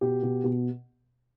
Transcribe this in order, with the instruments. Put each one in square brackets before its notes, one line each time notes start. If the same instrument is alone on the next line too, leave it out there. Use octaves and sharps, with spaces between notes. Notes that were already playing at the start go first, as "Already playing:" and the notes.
[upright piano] B2 G4
B2
B2